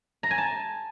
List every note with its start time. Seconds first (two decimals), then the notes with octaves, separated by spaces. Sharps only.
0.23 A#5
0.31 G#5
0.38 A5